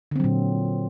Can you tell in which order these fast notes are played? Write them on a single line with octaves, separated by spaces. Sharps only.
D3 C4 F#3 A#2